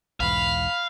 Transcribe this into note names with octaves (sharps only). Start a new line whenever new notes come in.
B1 E2 G#2 F5 B5